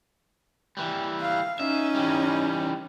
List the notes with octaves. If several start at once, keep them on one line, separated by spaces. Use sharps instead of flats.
E3 G3
F5
C#4 D#4 E5
E3 G3